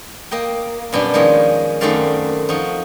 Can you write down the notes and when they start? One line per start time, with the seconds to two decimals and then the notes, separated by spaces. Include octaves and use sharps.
0.31 A#3 D#5 G5
0.93 F#2 B2 G3 D4
1.14 D#3 F3 G#3 A#3 C#4
1.81 F#2 D#3 A3 C4 D5 F5
2.49 F3 D#4 F#4